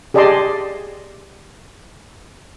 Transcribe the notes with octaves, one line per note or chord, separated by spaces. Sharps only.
G4 G#4 D5 D#5 A5 C6